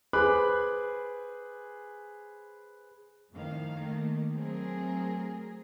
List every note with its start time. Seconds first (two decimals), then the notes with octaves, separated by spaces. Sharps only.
0.13 G#4 B4 C5 B5 D6 F#6
3.33 F2 A2 D#3 F5
3.74 D#3 A3 A#3
4.33 F#3 A3 C4 G#4 A#4